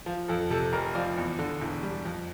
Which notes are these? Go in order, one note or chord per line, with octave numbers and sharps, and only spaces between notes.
F3
F2 A4
C3 A4
F1 A#4
F3 D5
E2
D3
E1
G3
F2